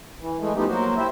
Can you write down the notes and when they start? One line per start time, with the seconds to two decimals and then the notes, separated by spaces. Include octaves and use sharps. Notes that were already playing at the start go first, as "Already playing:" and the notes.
0.20 E3
0.39 E3 G#3 A3
0.55 F3 G#3 A3 B3 D#4 G4
0.68 F#3 A#3 F#4 C5
0.97 E4 G4 C5 E5